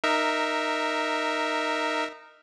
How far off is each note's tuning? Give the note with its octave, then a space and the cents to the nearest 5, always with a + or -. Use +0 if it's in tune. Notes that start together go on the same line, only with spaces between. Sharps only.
D#4 -15 A#4 +0 E5 +0